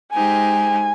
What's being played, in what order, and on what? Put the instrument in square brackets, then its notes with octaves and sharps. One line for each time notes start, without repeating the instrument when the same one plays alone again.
[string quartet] G#3 D#4 G4 C5 [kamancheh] G#5